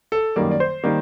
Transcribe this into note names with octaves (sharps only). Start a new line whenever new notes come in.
A4
F#2 D#3 G3 A#3 D5
D5
C5
D#3 G3 A#3